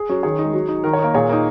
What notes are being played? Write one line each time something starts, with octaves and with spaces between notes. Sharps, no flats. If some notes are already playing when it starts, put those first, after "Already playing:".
Already playing: G#4
F#3 C#4
D#3 G#4 C#5
G#3 D#4
F#3
D#4
D#3 A#4
C#5
A#3 D#4 A#4
A#2 G#4 C#5
A#3 D#4